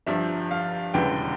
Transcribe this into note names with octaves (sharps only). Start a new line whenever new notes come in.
G1 G2 F3 E5
F5
E1 D2 C#3 E3 G5